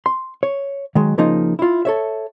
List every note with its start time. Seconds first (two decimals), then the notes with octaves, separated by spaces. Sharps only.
0.06 C6
0.43 C#5
0.95 D#3 F#3 G#3
1.18 C#3 F3 A#3 D#4
1.59 E4 F4
1.85 A4 C#5 E5